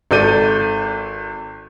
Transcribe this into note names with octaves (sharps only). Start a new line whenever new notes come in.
G#1 A4 D5 G6 D#7